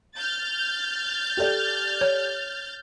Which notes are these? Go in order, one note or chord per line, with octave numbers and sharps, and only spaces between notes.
F6 G6 A6
G4 A4 D5
C#5